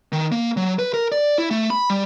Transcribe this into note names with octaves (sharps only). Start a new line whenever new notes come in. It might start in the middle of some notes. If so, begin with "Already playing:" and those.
D#3
A#3
F#3
B4
A#4
D5
E4
A3
B5
G3